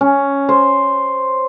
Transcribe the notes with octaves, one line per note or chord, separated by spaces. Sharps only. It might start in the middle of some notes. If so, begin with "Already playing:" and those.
C#4
C5